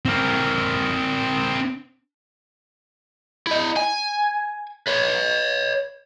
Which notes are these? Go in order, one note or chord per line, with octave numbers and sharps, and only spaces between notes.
C4 A#4
E4 D#5
G#5
B4 C#5